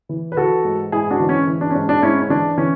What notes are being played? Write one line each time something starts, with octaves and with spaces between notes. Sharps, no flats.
E3
B4
E3 F#4 A4
G#2
G#2 E4 G#4
D4 F#4
E3
C#4 E4
E3
D4
C#4
G#2 D4
D4
G#2 C#4 E4
C#4
E3 D4
E3 C#4